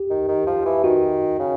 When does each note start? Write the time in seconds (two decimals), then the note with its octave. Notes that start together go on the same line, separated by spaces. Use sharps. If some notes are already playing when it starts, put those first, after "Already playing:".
Already playing: G4
0.10 D#3
0.29 D#3
0.47 F3
0.66 E3
0.84 D#3 F#4
1.39 C#3